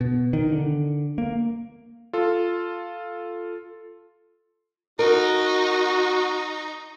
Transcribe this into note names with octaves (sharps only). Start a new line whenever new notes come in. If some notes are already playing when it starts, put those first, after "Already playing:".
B2
D#3
D3
A#3
F4 A4
D#4 F#4 A#4